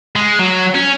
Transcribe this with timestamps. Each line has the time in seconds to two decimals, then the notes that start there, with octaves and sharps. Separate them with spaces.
0.16 G#3
0.39 F#3
0.75 C#4